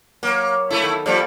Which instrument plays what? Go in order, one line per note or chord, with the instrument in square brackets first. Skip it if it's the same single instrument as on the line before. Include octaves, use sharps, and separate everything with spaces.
[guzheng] F#3 C#5 [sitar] A#3
[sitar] A3 E4 [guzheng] A4
[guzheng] D#3 F#3 B3
[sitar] F3 G3 [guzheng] A#3 D5 F#5